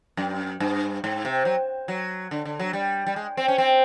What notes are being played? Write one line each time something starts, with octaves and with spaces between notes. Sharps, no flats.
F#2
G2
G#2
C3
F#3
F#3
D3
D3
F#3
G3
G3
G#3
C4
C#4
C4